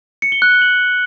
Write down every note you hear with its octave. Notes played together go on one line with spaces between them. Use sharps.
C#7
G7
F#6
G7
F#7